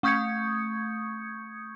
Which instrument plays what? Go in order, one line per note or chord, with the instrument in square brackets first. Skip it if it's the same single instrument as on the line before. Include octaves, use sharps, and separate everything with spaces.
[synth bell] A3 C#6 D#6 G6 G#6 C#7